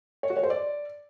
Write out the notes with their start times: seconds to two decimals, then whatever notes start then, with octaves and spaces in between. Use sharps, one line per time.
0.23 C#5
0.30 F#4
0.37 C#5
0.43 C5
0.50 D5